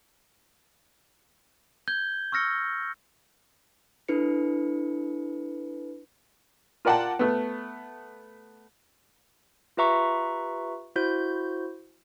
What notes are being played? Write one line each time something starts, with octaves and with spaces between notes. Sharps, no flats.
G6 G#6 G7
C#6 E6 F6 A#6 C#7
D4 E4 A4 B4 C#7
F4 A#4 D5 F#5 G5 A5
A3 B3
F4 G4 B4 E5 A#5 C#6
E4 F#4 C5 G6